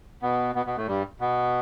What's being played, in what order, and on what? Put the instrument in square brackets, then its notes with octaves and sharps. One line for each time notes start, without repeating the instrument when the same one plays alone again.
[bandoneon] B2 B3
B2 B3
B2 B3
A2 A3
G2 G3
B2 B3